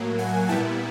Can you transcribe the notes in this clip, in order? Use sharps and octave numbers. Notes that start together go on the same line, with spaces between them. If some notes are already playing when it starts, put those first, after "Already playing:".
Already playing: A2 F#3 A#3
F#5 G#5
A#2 G3 B3 E4 G5 A5